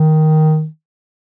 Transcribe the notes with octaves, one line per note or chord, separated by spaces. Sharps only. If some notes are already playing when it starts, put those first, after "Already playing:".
Already playing: D#3